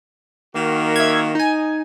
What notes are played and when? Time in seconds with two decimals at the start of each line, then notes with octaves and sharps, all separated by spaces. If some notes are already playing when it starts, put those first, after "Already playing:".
0.54 D#3 A#3 F#4
0.96 E5 G#6
1.35 D#4 G#5